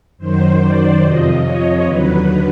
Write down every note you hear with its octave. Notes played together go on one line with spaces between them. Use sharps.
F#2 D#3 F#3 C5
D5
F2 C3 F3 D#5
C#5
D#2 D3 F#3 B4